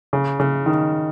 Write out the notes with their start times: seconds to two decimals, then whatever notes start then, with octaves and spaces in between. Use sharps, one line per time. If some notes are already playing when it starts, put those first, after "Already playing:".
0.13 C#3
0.40 C#3
0.66 D#3